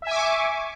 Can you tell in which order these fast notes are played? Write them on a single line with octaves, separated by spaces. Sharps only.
E5 G#5 D6 C#6